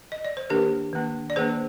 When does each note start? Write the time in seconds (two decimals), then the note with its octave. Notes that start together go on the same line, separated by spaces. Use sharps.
0.12 D#5
0.25 D5
0.37 C5
0.50 D#3 A#3 D4 G4 A#4
0.93 D#3 A#3 D4
1.30 D5
1.36 D#3 A#3 D4 G#4 C5